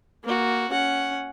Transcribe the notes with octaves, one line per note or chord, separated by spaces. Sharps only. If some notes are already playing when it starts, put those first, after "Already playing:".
A#3 F#4
C#4 F#5